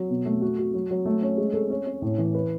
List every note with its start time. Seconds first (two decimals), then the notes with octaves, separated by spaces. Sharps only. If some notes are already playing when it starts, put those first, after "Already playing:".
Already playing: F#3
0.10 B2
0.25 A3
0.42 F#4
0.59 F#4
0.74 F#3
0.91 F#3
1.05 A3
1.22 C#4
1.38 G#3
1.54 A4
1.70 C#4
1.87 C#4
2.02 A2
2.18 E3
2.34 B4